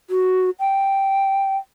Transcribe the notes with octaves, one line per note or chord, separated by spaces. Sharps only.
F#4
G5